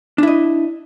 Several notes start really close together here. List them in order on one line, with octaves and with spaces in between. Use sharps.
D4 E4 D#5